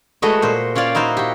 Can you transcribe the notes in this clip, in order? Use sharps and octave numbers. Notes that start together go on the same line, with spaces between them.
G#3 A3 F#4 B4 D#5
A#2 C5
C#4 F4 C#5 D5 F5
D#4 E4 F#4 C5 F5
F#4 G4